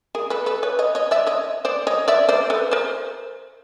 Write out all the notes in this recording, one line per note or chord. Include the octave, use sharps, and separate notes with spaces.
G#4 A#4
A4 B4
A4 B4
B4 C#5
C#5 D#5
C#5 D#5
D5 E5
C#5 D#5
C5 D5
C#5 D#5
D5 E5
C5 D5
A4 B4
A#4 C5